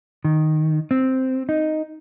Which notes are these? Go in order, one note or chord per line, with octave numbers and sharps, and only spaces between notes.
D#3
C4
D#4